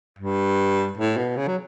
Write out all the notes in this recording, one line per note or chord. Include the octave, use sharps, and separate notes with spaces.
G2
A2
B2
C#3
F#3